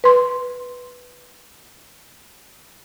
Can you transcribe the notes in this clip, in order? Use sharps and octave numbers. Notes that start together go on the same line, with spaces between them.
B4 C6